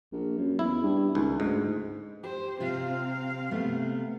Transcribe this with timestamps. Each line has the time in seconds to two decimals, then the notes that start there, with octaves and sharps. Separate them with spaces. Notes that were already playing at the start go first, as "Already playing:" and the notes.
0.12 A#1
0.38 F#2
0.59 E2 E4
0.83 G2
1.15 C#2 D#3
1.40 D2 G#2
2.24 G4 C5
2.60 C3 C4 F4 F5
3.51 C3 A3 B3